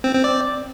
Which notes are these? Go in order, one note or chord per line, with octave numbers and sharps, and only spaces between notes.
C4
C4
D5